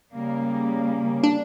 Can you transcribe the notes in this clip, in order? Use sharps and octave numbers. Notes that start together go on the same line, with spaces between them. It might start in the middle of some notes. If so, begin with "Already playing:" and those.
C#3 G3 A#3
D4